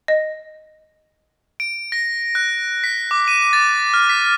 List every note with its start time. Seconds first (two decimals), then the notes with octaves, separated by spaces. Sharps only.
0.08 D#5
1.60 D7
1.92 A#6
2.35 F#6
2.84 B6
3.11 D6
3.28 D#7
3.53 A6
3.94 F6
4.10 B6